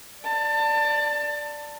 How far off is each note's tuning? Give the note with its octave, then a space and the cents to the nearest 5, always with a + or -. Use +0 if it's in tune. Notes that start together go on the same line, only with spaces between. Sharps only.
D5 +0 A5 +25